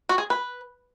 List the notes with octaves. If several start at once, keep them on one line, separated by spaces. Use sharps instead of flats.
F#4
G#4
B4